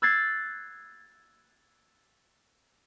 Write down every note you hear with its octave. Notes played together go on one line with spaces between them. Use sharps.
E6 F#6 G#6 A6 C7